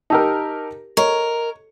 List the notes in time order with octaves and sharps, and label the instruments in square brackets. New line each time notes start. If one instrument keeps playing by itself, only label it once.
[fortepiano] D#4 G4 A#4 [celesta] A5 E6
[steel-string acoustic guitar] A#4 [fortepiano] C#5 [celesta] D#5